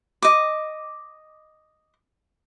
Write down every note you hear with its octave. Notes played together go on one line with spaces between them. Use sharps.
D#5 D6